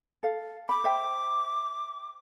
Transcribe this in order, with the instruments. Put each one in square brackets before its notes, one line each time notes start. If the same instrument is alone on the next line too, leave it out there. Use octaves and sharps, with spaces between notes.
[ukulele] A4 F5
[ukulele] B5 [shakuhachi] D6
[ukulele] C5 E5 G5